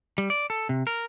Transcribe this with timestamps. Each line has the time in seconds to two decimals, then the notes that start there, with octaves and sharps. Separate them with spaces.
0.18 G3
0.30 D5
0.50 A4
0.69 C3
0.87 A#4